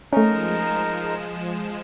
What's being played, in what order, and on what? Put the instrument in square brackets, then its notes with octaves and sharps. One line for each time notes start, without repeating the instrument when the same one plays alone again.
[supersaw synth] F3 G#3 E7 [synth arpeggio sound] A3 C#4 [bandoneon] D#4 A#4